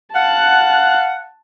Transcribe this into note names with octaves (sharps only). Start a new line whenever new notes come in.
F5 F#5 A5 F#6